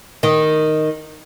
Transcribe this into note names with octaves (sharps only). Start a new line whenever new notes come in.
D#3